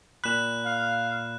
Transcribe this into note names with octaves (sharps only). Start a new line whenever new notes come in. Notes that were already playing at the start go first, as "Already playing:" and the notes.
A#2 B5 F#6 E7
F5